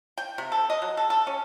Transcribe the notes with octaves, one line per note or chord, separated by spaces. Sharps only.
G5
C3
A4
D#5
F#3
A4
A4
C#4